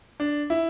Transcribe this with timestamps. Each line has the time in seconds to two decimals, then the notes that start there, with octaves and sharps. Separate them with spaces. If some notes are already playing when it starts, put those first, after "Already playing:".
0.20 D4
0.50 E4